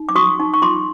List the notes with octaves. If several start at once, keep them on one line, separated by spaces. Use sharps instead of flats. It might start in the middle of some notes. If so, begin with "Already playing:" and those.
Already playing: D#4
D6
F#4 C#6 D#6
D#4
C#6
F4 C6 D6